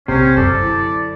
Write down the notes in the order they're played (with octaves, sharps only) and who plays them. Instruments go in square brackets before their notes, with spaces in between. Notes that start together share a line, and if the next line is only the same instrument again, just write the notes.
[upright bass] A#1 [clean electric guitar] C3 [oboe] C#4 [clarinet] C5
[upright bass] F#2 D3 [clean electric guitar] A4 [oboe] D5
[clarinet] E4